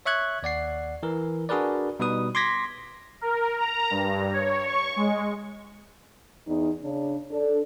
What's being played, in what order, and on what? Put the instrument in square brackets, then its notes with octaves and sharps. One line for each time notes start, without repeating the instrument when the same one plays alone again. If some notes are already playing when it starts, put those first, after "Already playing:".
[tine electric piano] C#5 E5 C#6 F#6 G#6
D#2 D5 F#5 C7
E3 A#4
D4 F#4 G#4 A#4 B4 D5
B2 G3 D#4 B4 D#6
C6 D6 G#6 A#6 B6
[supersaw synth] A#4
A#5
G2
C#5
C#6
G#3
[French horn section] E2 D#4
C#3 D4
D4 A4